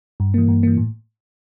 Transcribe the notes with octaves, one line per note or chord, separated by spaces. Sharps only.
G2
E3 A#3
G2
E3 A#3
A2